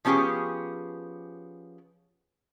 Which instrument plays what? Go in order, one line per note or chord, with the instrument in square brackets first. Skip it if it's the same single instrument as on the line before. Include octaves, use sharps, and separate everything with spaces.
[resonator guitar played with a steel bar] F3 B3 C#4 G4 G#4